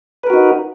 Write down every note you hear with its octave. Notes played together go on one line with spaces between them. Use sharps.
D#4 F#4 A#4 B4